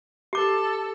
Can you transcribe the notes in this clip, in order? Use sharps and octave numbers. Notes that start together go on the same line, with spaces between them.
G4 A4 D6